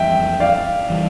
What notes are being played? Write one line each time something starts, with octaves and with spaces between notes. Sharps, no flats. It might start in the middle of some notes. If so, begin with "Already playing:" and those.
Already playing: F2 E3 G3 E5 G5
D5 F5
E3 G3